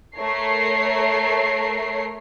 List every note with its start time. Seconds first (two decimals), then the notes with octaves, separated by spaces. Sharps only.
0.18 A3 A#4 C#5 C7